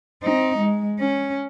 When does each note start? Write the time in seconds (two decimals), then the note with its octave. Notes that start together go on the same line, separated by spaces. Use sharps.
0.23 C4 D#4
0.58 G#3
0.99 C#4